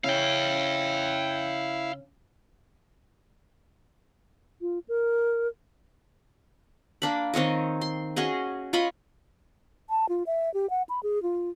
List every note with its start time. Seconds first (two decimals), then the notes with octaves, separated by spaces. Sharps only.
0.04 C#3 C#4 E4 F5 G5
4.61 F4
4.88 A#4
7.02 A#3 D4 B5
7.34 D#3 C4 C#5 D#5
7.81 C6
8.16 C#4 F#4 G#4 D#5
8.73 F4 C#5 D#5 B5
9.90 A5
10.09 F4
10.27 E5
10.54 G4
10.70 F#5
10.89 B5
11.03 G#4
11.23 F4